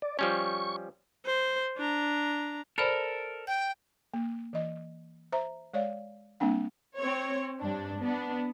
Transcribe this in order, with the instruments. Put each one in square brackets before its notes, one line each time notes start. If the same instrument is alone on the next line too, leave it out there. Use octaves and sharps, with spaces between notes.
[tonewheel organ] D5
[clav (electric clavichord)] F3 G3 C#4 [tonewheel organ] C#6
[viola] C5
D4 A#5
[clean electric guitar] A4 A#4 [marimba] C5 D5 B5
[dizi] G5 [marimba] G6
[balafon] A#3
E3 D#5
C5 E5 A#5
G#3 C#5 D5 F5
G3 A#3 C4 D4 F#5
[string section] C4 C#5
G2 D4
B3 D4